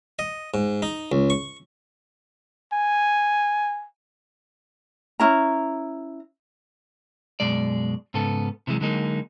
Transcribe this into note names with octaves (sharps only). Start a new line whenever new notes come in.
D#5
G#2
D#4
C#2
C#6
G#5
C#4 E4 A#5
F#2 B2 G#3 D5
G#2 C#3 B3 A4
C3 E3 F#3 G#3
D3 F#3 G#3 A#3 D#4